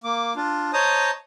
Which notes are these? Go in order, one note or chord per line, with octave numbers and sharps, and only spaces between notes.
A#3 D6
D4 F4
C5 C#5 D#5 A5 A#5 D#6